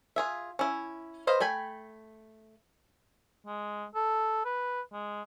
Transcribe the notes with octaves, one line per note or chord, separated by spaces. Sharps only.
F4 G#4 E5
C#4 E4
B4 C5 D#5 F5
A3 G5 G#5 B5
G#3
A4
B4
G#3